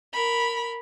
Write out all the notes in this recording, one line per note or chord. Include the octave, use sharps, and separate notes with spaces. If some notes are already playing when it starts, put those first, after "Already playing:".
A#4 B5